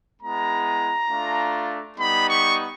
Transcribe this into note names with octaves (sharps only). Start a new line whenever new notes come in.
G#3 B3 E4 A#5
A3 D4 F4
G3 B3 D#4 B5
C#6